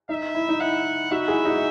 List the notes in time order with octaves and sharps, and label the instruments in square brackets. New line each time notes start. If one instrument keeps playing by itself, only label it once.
[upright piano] D#4 [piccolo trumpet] E5
[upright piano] E4
D#4
[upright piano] E4 [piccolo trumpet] F#5
[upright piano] D#4 F#4 [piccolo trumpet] E5
[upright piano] E4 G#4
D#4 F#4